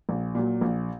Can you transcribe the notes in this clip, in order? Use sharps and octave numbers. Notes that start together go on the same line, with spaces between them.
A#1
A#2 F#3
A#1